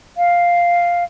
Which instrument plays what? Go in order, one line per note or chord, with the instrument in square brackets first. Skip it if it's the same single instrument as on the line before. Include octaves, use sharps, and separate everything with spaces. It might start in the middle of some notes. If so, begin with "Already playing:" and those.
[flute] F5